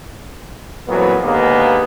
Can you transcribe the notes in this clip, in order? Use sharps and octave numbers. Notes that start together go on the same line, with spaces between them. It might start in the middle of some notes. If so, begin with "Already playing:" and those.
F2 A#2 E3 F#3 B3
D#2 D3 G#3 A#3 B3